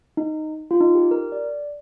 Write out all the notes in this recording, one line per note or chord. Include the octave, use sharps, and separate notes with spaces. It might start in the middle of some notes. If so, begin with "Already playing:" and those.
D#4
F4
D#4
G4
A#4
D5